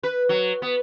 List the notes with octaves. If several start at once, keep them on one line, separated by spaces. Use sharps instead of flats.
B4
F#3
B3